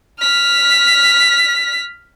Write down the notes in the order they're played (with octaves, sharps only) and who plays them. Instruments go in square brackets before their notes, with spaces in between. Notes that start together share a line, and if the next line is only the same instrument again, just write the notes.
[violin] F6 B6